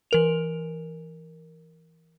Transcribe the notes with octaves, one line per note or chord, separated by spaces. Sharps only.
E3 A#4 F7